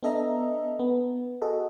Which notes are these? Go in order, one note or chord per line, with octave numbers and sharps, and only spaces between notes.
B3 D4 A4 D#5 E5 A#5
B3
F#4 G#4 A4 D#5